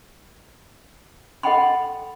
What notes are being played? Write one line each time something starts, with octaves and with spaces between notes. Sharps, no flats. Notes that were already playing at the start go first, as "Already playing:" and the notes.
A4 D#5 F#5 G5 B5 C6